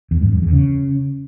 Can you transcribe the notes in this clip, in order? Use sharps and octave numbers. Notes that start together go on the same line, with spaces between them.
E2
G2
F2
E2
C#3